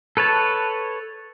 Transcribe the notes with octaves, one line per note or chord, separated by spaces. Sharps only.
A4 B4 C#5 A5